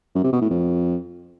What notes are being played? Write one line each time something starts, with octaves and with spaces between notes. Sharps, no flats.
F#2
C3
B2
A2
F2